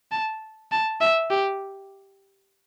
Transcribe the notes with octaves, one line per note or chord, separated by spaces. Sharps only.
A5
A5
E5
G4